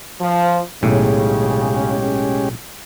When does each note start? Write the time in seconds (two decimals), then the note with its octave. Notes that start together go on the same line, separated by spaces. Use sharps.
0.20 F3
0.83 B1 A2 C#3 G#3 C#4 G4